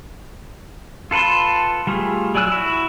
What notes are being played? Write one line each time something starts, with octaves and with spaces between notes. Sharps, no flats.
F4 A4 B4 A5 C6
G3 A3 F4 G#4
F#3 D5 G#5 E6 F#6
E4 F#4